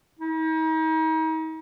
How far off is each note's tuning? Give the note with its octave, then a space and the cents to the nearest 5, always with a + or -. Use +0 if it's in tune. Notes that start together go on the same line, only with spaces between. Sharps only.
D#4 +40